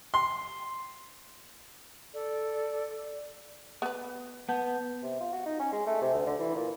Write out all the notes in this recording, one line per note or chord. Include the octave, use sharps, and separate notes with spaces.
C6
A4 D5
B3 B4
B3 F#5 A5 G6
C3
F4
F#4
D#4
C#4
G#3
A3
C3
D2
D3
E3
A#2